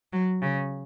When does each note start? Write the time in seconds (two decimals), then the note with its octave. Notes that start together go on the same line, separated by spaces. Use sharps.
0.13 F#3
0.42 C#3